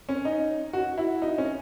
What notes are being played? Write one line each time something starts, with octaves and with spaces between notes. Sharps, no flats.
C#4
D#4
F#4
E4
D#4
C#4